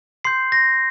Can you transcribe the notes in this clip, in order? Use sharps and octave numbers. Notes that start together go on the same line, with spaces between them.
C6 G6 C7
A#6